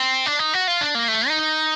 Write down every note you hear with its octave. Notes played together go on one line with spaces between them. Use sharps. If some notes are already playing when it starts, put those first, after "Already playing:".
Already playing: C4
D4
D#4
F#4
F4
D4
A#3
A3
D#4